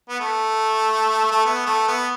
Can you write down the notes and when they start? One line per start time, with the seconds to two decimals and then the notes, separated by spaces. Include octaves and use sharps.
0.09 B3
0.20 A3
1.31 A3
1.45 B3
1.66 A3
1.87 B3